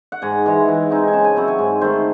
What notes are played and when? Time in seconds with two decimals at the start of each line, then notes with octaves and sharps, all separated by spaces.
0.12 F#5
0.22 G#2 G#5
0.46 E3 G#3
0.68 E3
0.90 C4 D#4
1.08 G#5
1.13 C#3 A5
1.24 G#5
1.36 F#3 C4 E4
1.48 G#5
1.59 G#2
1.81 D#3 A3 C5